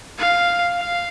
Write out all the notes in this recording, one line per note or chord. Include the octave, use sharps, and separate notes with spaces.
F5
F5